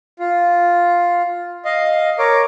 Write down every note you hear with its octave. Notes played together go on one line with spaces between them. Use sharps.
F4
D#5 F5
A#4 C#5 D6